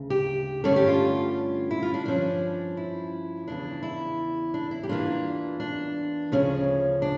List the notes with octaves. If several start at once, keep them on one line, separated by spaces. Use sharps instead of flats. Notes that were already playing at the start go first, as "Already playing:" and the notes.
Already playing: D2 C#3
G4
G2 D3 A3 C#4 A4
G4
F4
E4
F4
D4
G2 F3 C#4 D4
E4
E2 C#3 E3 D4
E4
D4
E4
G4
E2 E3 A#3 D4 F4
D4
D2 C#3 F3 C#4
D4